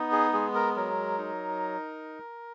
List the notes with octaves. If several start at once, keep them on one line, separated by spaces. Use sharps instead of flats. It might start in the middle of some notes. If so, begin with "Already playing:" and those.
Already playing: B3 D#4
G#4
G#3 G#4
A#4
F#3 A#4
D#4